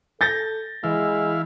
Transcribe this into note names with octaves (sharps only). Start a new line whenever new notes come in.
A4 G6 A6 A#6
E3 G#3 E4 F5